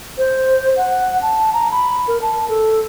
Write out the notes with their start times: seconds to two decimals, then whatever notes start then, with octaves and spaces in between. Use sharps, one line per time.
0.18 C5
0.77 F#5
1.22 A5
1.53 A#5
1.71 B5
2.07 A#4
2.22 A5
2.49 A4